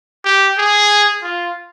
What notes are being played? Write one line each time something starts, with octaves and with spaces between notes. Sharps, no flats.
G4
G#4
F4